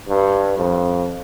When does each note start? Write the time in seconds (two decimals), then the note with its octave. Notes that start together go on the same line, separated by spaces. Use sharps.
0.09 G2
0.58 F2